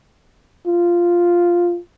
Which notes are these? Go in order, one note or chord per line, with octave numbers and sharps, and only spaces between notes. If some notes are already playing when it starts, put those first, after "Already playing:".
F4